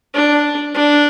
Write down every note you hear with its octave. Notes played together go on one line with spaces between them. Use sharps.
D4
D4